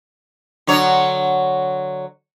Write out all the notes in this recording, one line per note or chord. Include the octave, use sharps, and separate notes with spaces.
D3 F#3 C#5